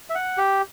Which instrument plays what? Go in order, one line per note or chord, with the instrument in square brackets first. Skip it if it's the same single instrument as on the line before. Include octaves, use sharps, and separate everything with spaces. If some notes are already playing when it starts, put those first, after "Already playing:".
[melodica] E5
F#5
G4